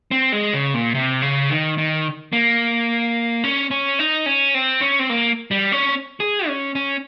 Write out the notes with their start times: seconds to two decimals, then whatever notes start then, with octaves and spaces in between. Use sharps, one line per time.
0.11 C4
0.32 G#3
0.53 C#3
0.74 A#2
0.95 C3
1.22 C#3
1.50 D#3
1.78 D#3
2.33 A#3
3.44 C#4
3.71 C#4
3.99 D#4
4.26 C#4
4.54 C4
4.81 C#4
4.99 C4
5.10 A#3
5.51 G3
5.72 C#4
6.20 G#4
6.47 C#4
6.75 C#4